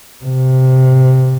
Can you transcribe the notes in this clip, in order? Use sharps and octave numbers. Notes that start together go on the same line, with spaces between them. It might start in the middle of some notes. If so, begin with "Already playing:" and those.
C3